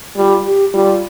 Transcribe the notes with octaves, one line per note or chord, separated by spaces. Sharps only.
G3 F4
G4
G3 F4